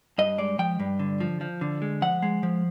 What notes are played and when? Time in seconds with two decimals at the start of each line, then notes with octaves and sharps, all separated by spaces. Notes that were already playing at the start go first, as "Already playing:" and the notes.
0.18 G2 D#5
0.38 G#3 D5
0.59 F3 G5
0.80 G2
0.99 D3
1.20 F3
1.41 F3
1.61 D3
1.82 G#3
2.02 F3 F#5
2.22 G#3
2.43 F3